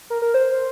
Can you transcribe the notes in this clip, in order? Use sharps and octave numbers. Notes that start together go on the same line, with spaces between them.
A#4
A#4
C5